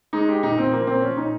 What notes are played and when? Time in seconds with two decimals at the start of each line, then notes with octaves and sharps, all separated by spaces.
0.13 G#3 D#4
0.28 G#3 G4
0.43 A#2 D#4
0.58 A#2 C4
0.72 F3 A#3
0.83 A#3
0.87 A#2 C4
1.02 F3 C#4
1.17 A#2 D#4